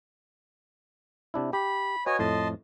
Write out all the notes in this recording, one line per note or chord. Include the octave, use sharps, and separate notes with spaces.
C3 D4 E4
G4 B5
F#4 B4 C#5 D#5 G#5
F2 A2 D#5 A5 C6